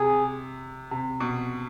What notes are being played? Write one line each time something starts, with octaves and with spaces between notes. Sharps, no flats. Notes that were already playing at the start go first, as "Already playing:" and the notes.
Already playing: C3 G#4
C3
B2